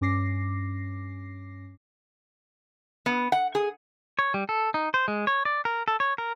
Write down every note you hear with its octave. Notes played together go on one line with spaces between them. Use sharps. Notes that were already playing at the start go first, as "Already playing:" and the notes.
G2 C#4 D6 A#6 C7
B3
F#5
G#4
C#5
G3
A4
D#4
C5
G#3
C#5
D5
A#4
A4
C#5
A#4